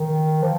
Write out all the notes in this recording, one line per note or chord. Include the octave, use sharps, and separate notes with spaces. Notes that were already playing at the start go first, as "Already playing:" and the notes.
Already playing: D#3
F3